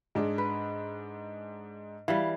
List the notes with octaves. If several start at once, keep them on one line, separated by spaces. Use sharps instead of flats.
G#2 D4 G#4
B4
E3 G3 F5